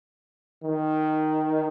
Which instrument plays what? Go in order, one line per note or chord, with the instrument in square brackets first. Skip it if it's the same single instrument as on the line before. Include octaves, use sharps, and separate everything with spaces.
[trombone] D#3